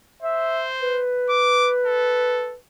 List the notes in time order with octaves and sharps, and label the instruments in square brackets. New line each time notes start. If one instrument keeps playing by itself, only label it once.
[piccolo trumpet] C5 [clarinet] E5
[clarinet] B4
[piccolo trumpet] D6
A4